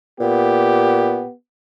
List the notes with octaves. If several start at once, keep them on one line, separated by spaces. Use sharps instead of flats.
A#2 B3 G4